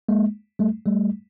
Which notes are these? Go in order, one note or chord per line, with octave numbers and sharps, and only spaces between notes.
G#3 A#3
G3 A3
G3 A3